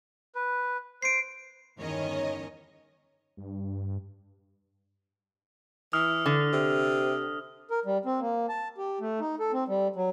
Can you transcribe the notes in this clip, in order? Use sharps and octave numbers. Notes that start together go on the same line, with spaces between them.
B4
C5 C7 D7
G1 E2 D#3 C#4 C#5 D#5
G2
E3 D#6 F6
D3
C3
A#4
G3
C4
A#3
A5
G4
A3
D#4
A4
C4
G3
F#3